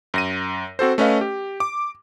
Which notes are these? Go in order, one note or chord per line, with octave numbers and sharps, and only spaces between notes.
F#2 A#6 D#7
C4 F#4 A4 C5
A3 C#4 B4 D#5 F5
G4
D6